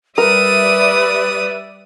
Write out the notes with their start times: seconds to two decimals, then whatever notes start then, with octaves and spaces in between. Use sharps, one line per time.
0.18 G3 A#4 B4 D5 E5 D#6